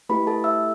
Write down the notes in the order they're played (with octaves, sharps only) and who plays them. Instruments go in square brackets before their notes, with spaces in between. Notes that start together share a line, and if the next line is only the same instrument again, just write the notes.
[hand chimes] A3 E4 G4 B4 B5
A4 A5
E5 E6